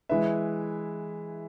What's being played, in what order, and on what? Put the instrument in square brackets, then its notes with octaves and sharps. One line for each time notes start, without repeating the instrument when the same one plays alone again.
[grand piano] E3 G#3 E4 B4 E5